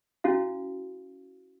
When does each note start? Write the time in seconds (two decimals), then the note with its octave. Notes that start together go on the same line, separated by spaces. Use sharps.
0.24 C#4 E4 F#4 F5